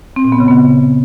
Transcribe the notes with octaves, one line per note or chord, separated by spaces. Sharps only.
C4
A#2
B3
C#3
B3